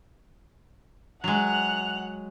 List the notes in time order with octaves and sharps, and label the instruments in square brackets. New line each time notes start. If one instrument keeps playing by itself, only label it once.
[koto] F#3 G#3 [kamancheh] F#5 F#6 [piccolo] F7